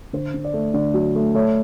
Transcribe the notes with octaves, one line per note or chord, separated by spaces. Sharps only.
D3 C5
D3
D5
A3
D3 D5
F#3
A3
A3 C#5